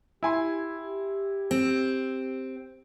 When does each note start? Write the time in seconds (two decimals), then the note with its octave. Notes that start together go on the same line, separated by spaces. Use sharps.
0.23 E4 G4 G#5 C6
1.51 C4